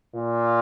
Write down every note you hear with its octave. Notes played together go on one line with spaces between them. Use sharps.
A#2